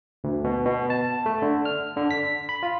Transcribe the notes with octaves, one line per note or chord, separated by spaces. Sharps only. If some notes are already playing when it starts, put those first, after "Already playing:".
D2
B2
B2
A5
A3
D3
F6
D3
B6
B5
F4